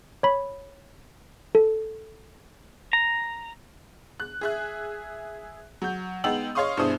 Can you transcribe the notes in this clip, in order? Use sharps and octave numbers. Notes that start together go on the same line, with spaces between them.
C#5 B5
A4
A#5
F#6
G#4 E5 F#6
F#3 G6
G#3 B3 D#4 G5 E6 F#7
C#5 D#5 F5 C6 C#6 D#6
G2 B2 E4 G#4 C5 D#6